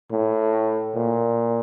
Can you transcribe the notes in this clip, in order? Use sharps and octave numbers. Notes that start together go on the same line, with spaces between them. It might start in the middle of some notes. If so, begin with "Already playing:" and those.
A2
A#2